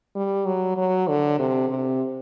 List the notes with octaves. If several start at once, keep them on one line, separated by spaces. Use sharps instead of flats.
G3
F#3
F#3
D3
C3
C3